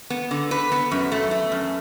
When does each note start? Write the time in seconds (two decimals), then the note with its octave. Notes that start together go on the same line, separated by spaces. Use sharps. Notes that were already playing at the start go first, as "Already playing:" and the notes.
0.10 B3
0.31 D3
0.51 B4
0.72 B3
0.91 F#2
1.12 A3
1.31 A3
1.52 F#2